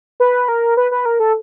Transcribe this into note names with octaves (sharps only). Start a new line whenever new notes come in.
B4
A#4
B4
B4
A#4
A4